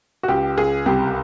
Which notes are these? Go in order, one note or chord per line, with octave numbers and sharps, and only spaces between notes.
F#4
C#2 G4
C#2 G#4
C2 G4